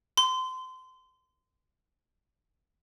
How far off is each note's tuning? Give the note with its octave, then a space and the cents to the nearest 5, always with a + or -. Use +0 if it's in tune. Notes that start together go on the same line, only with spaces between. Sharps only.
C6 -25